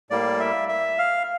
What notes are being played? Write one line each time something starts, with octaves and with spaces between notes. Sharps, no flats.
A2 G3 A#3 D5
E5
E5
F5